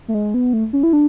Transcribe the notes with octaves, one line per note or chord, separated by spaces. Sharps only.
A3
G#3
B3
A3
C#4
E4
D4